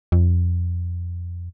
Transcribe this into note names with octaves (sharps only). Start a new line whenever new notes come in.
F2